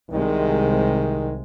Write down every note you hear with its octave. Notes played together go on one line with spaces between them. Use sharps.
C2 C3 D#3 G#3